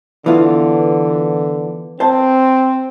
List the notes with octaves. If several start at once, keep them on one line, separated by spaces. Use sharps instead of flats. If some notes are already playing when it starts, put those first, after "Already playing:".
D3 E3 B3 F4
C4 C5 A5